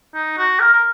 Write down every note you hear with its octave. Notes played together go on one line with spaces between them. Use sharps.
D#4
F#4
A#4
A#4